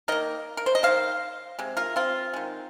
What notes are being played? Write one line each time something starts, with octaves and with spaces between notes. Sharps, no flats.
D#3 A#3 A#4 D#5
A#4
C5
D#5
D#3 G#3 C5 F5
C3 G#3
F4 A#4
C4 F4
D#3 G#3